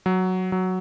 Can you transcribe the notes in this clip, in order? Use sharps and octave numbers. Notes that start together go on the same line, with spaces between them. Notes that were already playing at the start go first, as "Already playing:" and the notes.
F#3
F#3